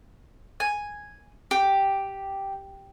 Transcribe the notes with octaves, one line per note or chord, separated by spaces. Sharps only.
G#5
G4